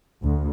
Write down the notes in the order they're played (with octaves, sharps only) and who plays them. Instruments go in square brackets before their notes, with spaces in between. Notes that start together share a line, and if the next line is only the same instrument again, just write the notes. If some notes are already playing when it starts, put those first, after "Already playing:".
[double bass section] D2